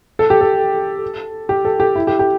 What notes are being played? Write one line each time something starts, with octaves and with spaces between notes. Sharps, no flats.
A4
G4
A4
G4
A4
G4
E4
G4
G4